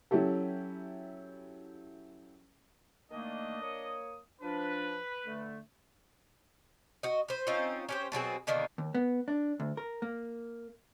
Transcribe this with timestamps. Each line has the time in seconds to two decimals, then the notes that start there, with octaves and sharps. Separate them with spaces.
0.11 F#3 C#4 E4 G4 A4
3.11 D#3 A3 A#3 D4 D#5
3.61 A#3 C#5 D#6
4.41 F3 D4 B4
5.26 D3 A3
7.03 F#4 D#5
7.29 B4 C5
7.47 C4 C#4 D#4 F4
7.89 C#4 G4 C5
8.12 B2 F#3 C4 G#4
8.47 B2 D3 D#3 A#3
8.78 D#2
8.95 B3
9.28 D4
9.60 D2
9.77 A#4
10.02 A#3